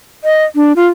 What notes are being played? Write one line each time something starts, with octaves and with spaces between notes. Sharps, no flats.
D#5
D4
F4